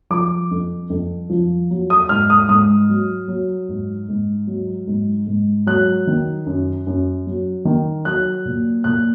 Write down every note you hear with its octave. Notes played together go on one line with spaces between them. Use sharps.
F3 D6
F2
F2
F3
F#3
D#6
G#2 F6
D#6
G#2 D#6
F#3
F#3
G#2
G#2
F#3
G#2
G#2
F#3 F#6
D#3
F#2
F#2
F#3
D#3
F#3 F#6
A#2
A#2 F#6